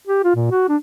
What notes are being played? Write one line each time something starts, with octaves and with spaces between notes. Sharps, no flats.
G4
F4
A#2
F#4
D4